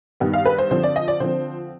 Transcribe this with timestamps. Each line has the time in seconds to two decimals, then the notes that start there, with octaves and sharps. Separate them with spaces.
0.20 G2 D#3 B3
0.33 F5
0.46 B4
0.58 C5
0.71 D3 F3 C4 C5
0.83 D5
0.96 D#5
1.08 D5
1.20 D3 F3 C4 C5